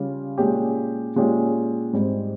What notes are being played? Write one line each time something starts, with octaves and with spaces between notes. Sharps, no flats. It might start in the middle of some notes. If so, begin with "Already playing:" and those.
Already playing: C#3 G3 C#4 F4
A#2 G#3 C#4 G4
A#2 G#3 C#4 G4
G#2 G3 C4